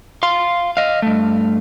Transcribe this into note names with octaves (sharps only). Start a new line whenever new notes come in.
F5 C6
D#5 F5
G2 A3